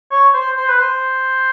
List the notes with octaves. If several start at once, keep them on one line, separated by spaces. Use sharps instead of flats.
C#5
C5
C5
B4
C5